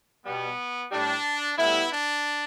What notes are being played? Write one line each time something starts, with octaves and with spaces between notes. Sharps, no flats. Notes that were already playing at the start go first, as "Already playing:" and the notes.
B2 G3 B3
A2 G3 D4
A2 G3 B3 E4
D4